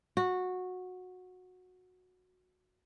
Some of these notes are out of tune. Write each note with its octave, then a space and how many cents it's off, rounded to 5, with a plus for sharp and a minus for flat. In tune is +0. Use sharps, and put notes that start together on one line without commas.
F#4 -15